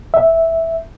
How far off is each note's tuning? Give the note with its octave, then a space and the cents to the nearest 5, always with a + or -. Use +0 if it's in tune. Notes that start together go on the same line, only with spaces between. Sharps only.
E5 -5